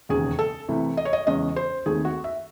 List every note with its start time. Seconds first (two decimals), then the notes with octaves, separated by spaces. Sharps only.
0.09 E1 D#2 C#3 G#4
0.39 A4
0.68 C2 C3 E3 A3
0.97 D#5
1.05 C#5
1.13 D#5
1.27 E2 C#3 G#3 C#4 D#5
1.56 C5
1.86 D#2 D#3 A3 C4 G#4
2.05 F#4
2.24 E5